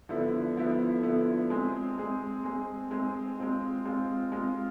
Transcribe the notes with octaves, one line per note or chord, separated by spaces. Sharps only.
D3 F3 B3 E4
D3 F3 B3 E4
D3 F3 B3 E4
G#3 C4 G#4
G#3 C4 G#4
G#3 C4 G#4
G#3 C4 G#4
G#3 C4 F4
G#3 C4 F4
G#3 C4 F4